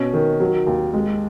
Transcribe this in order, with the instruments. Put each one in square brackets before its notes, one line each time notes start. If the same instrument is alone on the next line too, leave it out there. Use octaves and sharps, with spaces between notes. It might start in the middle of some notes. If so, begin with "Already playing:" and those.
Already playing: [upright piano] B2 C#4
D#3
F#3
D#2
G#3